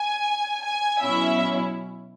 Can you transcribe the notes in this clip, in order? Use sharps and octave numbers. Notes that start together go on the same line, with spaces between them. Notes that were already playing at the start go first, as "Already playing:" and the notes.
Already playing: G#5
G#5
B2 F#3 C#4 E4 E5